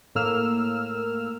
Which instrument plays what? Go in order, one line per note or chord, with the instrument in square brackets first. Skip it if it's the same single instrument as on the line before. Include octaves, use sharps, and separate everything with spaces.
[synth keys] A2 A#3 E6 F6